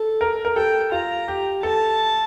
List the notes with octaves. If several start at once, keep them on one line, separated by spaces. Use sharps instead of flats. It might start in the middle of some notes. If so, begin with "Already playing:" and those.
Already playing: A4
A#4
A#4
A4 G5
F4 A#5
G4
A4 A5